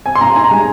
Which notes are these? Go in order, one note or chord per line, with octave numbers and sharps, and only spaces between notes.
C4 G#5
C6
A#2 A#5
D#4 G#5
A#5
G#3 G#5